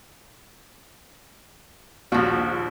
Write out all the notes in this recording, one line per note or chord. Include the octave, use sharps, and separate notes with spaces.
A#1 D#2 F3 F#4